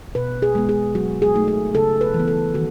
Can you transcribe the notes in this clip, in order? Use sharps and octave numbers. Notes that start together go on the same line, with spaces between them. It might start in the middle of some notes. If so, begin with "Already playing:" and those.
B2 B4
G#4
G#3 B3
G#4
F#3 F#4
G#4
A3 D#4
G#4
C#3 A4
B4
E3
B3
A4
D#3 F#4